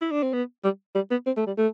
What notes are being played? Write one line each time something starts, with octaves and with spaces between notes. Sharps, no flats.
E4
D4
C4
B3
G3
G3
B3
C4
A3
G3
A3